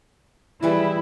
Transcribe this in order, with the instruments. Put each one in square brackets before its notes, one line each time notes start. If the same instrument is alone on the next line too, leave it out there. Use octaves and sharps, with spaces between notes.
[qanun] E3 G3 G#4 [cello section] E4